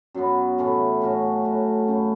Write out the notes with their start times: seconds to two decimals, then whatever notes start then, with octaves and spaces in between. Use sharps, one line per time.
0.14 F#2 F#3 B3 F#4
0.58 A2 E3 A3
1.01 A2 F#3 C#4 F#4
1.45 A2 F#3 A3 F#4
1.88 F#2 C#3 E3 A3